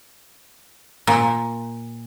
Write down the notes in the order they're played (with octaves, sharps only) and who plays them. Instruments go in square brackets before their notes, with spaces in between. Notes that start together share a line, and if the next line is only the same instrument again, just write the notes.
[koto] A#2